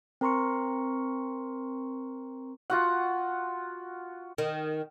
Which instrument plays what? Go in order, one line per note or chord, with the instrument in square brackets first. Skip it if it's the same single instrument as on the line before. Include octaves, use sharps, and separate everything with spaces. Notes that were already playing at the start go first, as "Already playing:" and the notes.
[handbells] C4 A#4 A#5 C6 C#6 C#7
[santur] F4 F#4 F#5
[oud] D#3